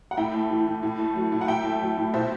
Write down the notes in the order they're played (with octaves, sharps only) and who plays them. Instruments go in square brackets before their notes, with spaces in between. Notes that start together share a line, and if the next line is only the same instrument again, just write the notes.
[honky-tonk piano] F#5
A2 E5 G5
A3
E3
A2
A2
A3
F#3
A2
F#5
A2 E5 G5
A3
F#3
A2
B2 C5 E5